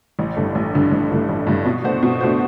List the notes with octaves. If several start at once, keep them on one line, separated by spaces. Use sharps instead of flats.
A1
G2 D3 A3
A1
G2 D3 A3
A1
G2 D3 A3
A1
G2 D3 A3
B2
A3 D4 F#4 C5
B2
A3 D4 F#4 C5